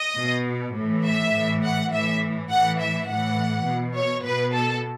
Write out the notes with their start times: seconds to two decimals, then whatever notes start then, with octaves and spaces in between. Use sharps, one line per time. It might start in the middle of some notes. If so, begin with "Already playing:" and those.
Already playing: D#5
0.19 B2
0.77 A2 E3
1.06 E5
1.35 A2 E3
1.64 F#5
1.93 A2 E3 E5
2.50 A2 E3 F#5
2.80 E5
3.09 A2 E3 F#5
3.67 B2
3.96 C#5
4.25 B2 B4
4.54 A4